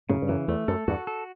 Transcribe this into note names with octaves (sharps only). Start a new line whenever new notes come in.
F#2 A2 C#3
G2
F#2 E3
E2 A3
F#2 A4
E2 G2 F#4
A4